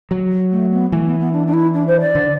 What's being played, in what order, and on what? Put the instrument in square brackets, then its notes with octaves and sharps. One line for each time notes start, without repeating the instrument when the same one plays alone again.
[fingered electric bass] F#3
[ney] A3
B3
[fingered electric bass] E3 [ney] A3
[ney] B3
B3
D4
D4
E4
D4
C5
D5
[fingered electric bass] D3